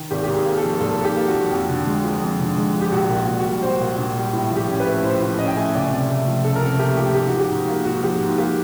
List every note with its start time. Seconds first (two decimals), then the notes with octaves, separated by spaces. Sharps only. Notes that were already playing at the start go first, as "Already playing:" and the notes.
Already playing: D#3
0.11 G#1 G4
0.24 G#2 G4
0.34 G#4
0.46 A#3
0.57 A4
0.63 F3
0.80 G#1 A4
0.99 G#2
1.05 G4
1.16 A#3
1.28 F#4
1.33 F3
1.51 F2
1.69 D3
1.87 G#3
2.04 F3
2.22 F2
2.39 D3
2.57 G#3
2.75 F3
2.81 G4
2.92 A#1 F#4
3.10 A#2
3.15 F#4
3.27 A#1
3.39 F#4
3.45 G3
3.63 A#1 C5
3.81 A#2
3.98 A#1
4.16 G3
4.33 A2
4.51 F3
4.56 G4
4.68 C#4
4.80 B4
4.86 A3
5.03 A2 C5
5.21 F3
5.38 C#4 D#5
5.47 G5
5.56 A3 G#5
5.74 C#2 D5
5.91 C3
6.10 A3
6.27 F3
6.44 C#2 A4
6.56 A#4
6.62 C3 A4
6.79 A3 G4
6.97 F3 G4
7.15 G#2 G4
7.28 F3 F#4
7.39 G4
7.50 G#2
7.68 A#3
7.85 G#2 F#4
8.03 F3 G4
8.21 G#2
8.38 A#3 G4